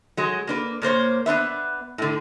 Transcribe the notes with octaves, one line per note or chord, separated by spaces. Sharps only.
F#3 G#3
A#3 D4 B4
A#2 A#3 C5 C#5
B3 D4 B4 E5
A2 D3